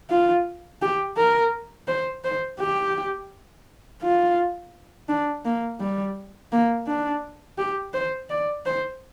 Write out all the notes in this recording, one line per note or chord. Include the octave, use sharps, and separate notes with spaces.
F4
G4
A#4
C5
C5
G4
F4
D4
A#3
G3
A#3
D4
G4
C5
D5
C5